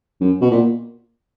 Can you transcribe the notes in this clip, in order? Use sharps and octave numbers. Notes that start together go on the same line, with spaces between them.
F#2
B2
A#2